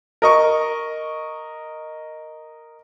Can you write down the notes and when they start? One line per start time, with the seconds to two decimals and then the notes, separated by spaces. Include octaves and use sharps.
0.22 A#4 D#5 C#6